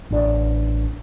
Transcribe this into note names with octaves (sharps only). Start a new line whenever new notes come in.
A1 D4